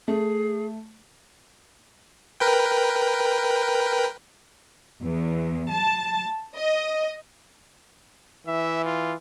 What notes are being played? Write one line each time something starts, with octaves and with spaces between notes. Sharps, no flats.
A3 G#4
A#4 B4 G5
E2
A5
D#5
E3 E5
F4